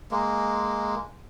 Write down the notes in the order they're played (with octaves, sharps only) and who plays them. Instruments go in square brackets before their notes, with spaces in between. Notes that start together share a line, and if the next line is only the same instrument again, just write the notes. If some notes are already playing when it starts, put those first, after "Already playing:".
[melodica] G#3 A#3